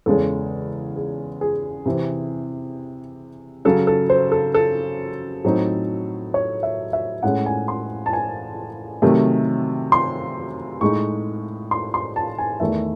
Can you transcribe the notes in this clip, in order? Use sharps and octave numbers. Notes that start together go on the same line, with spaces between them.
E2 C#3 G#3 C#4 A4
G#4
G#4
C3 E3 C4
C#3 F#3 C#4 A4
A4
C5
A4
A4
A2 F#3 C4 D#4
C#5
E5
E5
A2 G#3 C#4 F#5
G#5
C6
A5
G#5
C3 D#3 F#3 A3
C6
A2 G#3 D#4 C#6
C6
C6
A5
G#5
E2 D#3 A3 E5